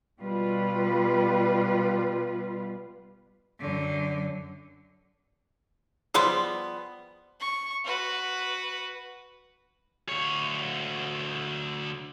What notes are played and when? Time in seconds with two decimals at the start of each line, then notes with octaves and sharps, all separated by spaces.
0.20 B2 G3 F4 B4
3.59 F#2 D3
6.14 F3 G3 B3 G#4 C6
7.40 C#6
7.84 F#4 B4
10.09 D2 C#5